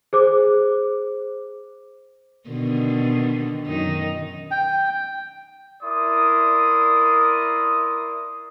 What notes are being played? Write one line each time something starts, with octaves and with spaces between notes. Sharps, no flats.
G#4 C5 D6
B2 D3 D#3
F#2 D#3 D#4
G5
E4 A#4 D5 C6 D#6